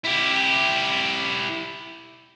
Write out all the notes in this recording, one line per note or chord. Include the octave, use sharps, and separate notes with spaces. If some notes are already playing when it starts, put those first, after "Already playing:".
E4 G4